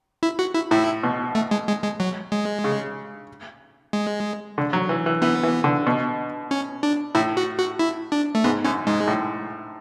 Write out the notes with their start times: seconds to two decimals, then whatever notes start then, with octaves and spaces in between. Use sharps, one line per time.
0.23 E4
0.39 F#4
0.54 E4
0.71 A2 E4
1.03 B2
1.35 A3
1.51 G#3
1.68 G#3
1.83 G#3
2.00 F#3
2.32 G#3
2.64 C#3
3.93 G#3
4.58 D3
4.73 F#3
4.89 E3
5.06 E3
5.22 E3 B3
5.43 E3
5.64 D3
5.87 B2
6.51 C#4
6.83 D4
7.15 A2 E4
7.37 F#4
7.58 F#4
7.79 E4
8.12 D4
8.35 A3
8.44 G#2 B3
8.65 F#2 C#4
8.87 G#2 G#3
9.07 A2